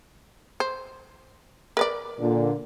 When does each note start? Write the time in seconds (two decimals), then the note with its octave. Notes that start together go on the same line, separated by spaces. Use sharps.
0.60 C5
1.77 A#4 B4 D5
2.19 A#2 D3